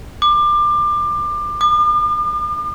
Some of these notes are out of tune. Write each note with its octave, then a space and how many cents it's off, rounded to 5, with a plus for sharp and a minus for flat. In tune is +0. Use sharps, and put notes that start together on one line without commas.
D6 +25
D6 +45